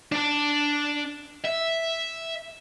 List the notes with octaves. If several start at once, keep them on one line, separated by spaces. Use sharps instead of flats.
D4 A5
E5